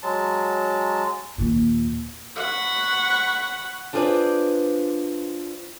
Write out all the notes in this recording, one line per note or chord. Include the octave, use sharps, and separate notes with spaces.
F#3 G#3 A5
D#2 A#2
F#5 B5 C#6
D4 F4 G#4 B4 C5 D5